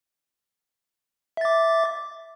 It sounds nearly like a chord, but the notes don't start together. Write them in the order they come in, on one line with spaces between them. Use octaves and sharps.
E5 A6 D6